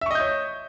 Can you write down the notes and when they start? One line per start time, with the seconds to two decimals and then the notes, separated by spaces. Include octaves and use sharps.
0.01 E5
0.06 C#6
0.11 D#5
0.15 G6
0.20 C#5